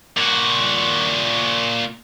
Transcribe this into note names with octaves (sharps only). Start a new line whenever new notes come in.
A#2 F#4